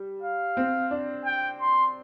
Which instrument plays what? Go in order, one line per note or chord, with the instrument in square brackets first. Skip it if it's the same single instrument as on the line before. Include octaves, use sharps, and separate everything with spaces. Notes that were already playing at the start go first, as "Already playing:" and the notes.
Already playing: [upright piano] G3
[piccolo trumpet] F5
[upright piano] C4
D4
[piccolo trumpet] G5
C6